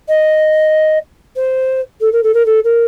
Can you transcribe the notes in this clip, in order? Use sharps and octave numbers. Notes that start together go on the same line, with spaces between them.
D#5
C5
A4
A#4
A4
A#4
A4
A#4